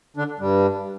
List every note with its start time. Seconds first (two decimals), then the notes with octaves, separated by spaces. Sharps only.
0.16 D3 D4
0.39 G2 G3